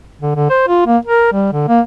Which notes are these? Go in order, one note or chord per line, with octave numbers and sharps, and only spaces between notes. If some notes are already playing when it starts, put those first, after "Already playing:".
D3
D3
C5
F4
A#3
A#4
G3
D3
A#3